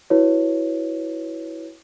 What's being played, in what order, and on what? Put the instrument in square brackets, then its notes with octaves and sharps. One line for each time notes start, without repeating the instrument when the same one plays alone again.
[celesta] E4 F#4 B4 C#5